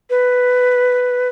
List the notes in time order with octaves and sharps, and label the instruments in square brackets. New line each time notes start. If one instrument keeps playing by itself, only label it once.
[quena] B4